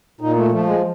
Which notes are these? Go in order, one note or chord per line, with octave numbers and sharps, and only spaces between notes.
A#2 D#4
A3
F3 A3
G#3